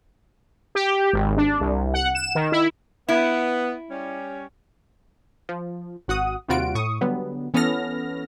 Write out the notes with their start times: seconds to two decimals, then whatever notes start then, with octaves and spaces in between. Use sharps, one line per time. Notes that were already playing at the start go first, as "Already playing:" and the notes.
0.75 G4
1.13 G#1
1.37 D4
1.61 C2
1.94 F#5
2.15 E7
2.35 D#3
2.52 E4
3.09 B3 E4
3.90 G3 C#4
5.49 F3
6.08 G#1 F#4 F#5 D#6
6.48 D#2 C3 G3 F4 F#4 D7
6.75 A2 C#6 D#6
7.01 D3 F#3 G3 B3
7.54 E3 B3 C#4 A4 F6 A#6